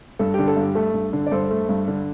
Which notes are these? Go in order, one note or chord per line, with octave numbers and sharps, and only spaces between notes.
G2 A4
D3 G4
A4
G2 G4
A3 A4
G2
D3
D5
G2 A4 C5
A3
G2
D3